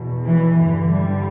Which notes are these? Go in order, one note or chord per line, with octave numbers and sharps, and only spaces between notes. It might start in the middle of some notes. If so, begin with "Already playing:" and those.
Already playing: E2 B2
E3
G2 D3 E3
G3